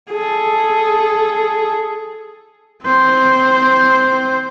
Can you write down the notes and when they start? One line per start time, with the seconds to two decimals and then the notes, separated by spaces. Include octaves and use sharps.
0.11 G#4 A4
2.85 C4 C5